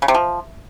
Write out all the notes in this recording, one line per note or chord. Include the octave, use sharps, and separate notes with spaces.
C#3
C3
F3